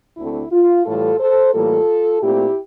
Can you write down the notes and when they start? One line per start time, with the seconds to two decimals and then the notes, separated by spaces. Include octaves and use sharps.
0.17 D2 D3 A3 C4 E4
0.51 F4
0.86 A2 E3 G3 F4 A4
1.19 A4 C5
1.54 A2 E3 G3 A#3 F4 A4
2.22 A#2 A3 C4 E4 G4